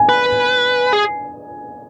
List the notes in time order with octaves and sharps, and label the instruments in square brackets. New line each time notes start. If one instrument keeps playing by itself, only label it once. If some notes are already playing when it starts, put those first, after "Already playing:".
Already playing: [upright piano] G#5
[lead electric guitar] B4
G#4